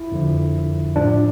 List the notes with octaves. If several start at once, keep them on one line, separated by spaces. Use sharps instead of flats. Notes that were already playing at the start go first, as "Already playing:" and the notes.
Already playing: E4
F2 D3 F3
A2 F3 D4